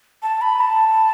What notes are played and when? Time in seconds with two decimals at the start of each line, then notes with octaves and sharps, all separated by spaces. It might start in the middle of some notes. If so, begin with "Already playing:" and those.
0.23 A5
0.41 B5
0.61 A5